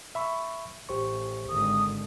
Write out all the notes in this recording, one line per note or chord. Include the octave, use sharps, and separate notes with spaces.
E5 B5 C#6
A1 G4 C5 C#6
G#1 D3 D#6